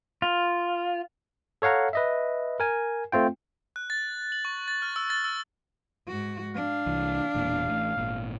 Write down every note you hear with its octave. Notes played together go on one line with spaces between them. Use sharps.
F4
A4 C#5 F5 F#5 A#5
B4 D#5 E5
A#4 G#5
A3 C4 F4 G5
F#6
A6
F#7
C#6
A6
F6
E6
A6
E6
G#2 F#4
D4 F5
C2 E3
E1 E2 A#2
A1 A2
G#1 A#2